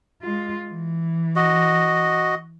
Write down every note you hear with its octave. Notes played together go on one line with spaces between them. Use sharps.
G#3 F4
E3
F#4 D#5